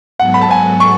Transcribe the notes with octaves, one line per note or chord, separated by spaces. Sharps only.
G#2 F#3 B3 F#4 A4 F#5
B5
A5
G#5
C#6